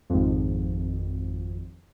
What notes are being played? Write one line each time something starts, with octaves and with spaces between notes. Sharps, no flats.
G#1 F2